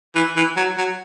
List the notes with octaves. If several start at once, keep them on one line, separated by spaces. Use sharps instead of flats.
E3
E3
F#3
F#3